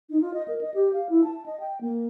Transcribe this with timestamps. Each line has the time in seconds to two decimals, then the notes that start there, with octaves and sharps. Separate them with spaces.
0.10 D#4
0.21 F4
0.34 D#5
0.48 A#4
0.61 D#5
0.74 G4
0.94 F5
1.09 E4
1.24 A5
1.46 D#5
1.60 G5
1.81 A#3